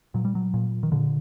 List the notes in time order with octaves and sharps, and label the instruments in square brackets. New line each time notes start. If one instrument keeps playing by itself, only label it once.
[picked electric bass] A#2 F#3
G3
F#3
A#2
D#3
A#2 D3